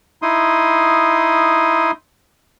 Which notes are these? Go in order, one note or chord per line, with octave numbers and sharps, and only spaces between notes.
D#4 E4 C6 D#6